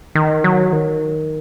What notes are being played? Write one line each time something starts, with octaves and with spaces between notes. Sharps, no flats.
D#3
F#3
D#3